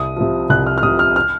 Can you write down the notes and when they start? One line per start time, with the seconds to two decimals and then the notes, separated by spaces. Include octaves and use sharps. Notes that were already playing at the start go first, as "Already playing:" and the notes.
Already playing: C2 D#6
0.16 C3 F3
0.49 C2 F#6
0.67 F6
0.78 F6
0.83 C3 F3 D#6
0.99 F6
1.16 F6